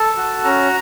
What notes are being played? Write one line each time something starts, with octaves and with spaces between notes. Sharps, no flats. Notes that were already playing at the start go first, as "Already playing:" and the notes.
Already playing: A4 A5
F#4
C#4 A#5